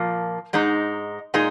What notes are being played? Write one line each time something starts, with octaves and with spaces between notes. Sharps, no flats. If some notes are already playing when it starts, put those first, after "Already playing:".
Already playing: A#2 F3 A#3
G#2 G#3 D#4
A#2 G#3 D#4 G#4